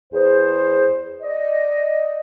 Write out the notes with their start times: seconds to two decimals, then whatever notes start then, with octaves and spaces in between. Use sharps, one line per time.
0.13 E2 G#4 C5
1.22 D5 D#5